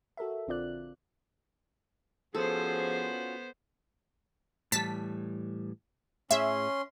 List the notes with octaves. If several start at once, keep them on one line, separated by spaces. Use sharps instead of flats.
F#4 A4 A#4 E5
A#1 D3 C4 F4 D5 F#6
F3 B3 C#4 F4 F#4 G#4 A4 C5
A2 E3 G3 A5 B6
A2 C#4 G#4 E5 C6